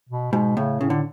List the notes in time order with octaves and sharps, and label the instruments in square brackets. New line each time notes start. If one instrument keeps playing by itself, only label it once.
[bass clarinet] B2
[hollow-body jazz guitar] G#2 [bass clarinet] B2
[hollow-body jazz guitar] A2 [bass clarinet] C#3
[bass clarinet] A2 [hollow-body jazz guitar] C#3
[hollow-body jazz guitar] D3